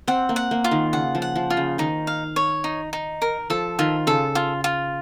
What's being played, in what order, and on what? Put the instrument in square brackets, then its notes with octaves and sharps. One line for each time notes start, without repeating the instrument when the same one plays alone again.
[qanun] C4 [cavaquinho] F#5
[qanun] A#3
[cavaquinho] F#5
[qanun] A#3
[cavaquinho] F4
[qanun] D#3
[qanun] C#3 [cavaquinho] F#5
[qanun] F3
[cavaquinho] F#5
[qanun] F3
[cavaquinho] F4
[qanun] C#3
[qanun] D#3 [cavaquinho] D#4
[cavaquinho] F5
C#5
D#4
D#4
A#4
[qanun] F3 [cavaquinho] A4
[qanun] D#3 [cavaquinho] F4
[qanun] C#3 [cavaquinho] A4
[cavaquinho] F4
F4